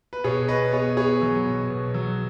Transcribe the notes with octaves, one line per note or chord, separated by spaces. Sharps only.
B4
B2 G#4 C#5
B3 B4 D#5
B3 G#4 C#5
B3 G#4 C#5
F#3
B2
B2
F#3